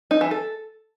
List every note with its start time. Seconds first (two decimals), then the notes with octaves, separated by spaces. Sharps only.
0.11 D#4
0.21 E3
0.31 A4